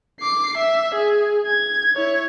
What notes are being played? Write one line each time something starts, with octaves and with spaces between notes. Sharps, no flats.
D6 C7
E5
G#4
G#6
E4 C#5